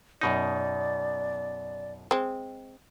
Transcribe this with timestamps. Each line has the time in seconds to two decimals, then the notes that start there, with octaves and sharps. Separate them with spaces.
0.21 F#2 B2 D#4 D5
2.11 G#3 C4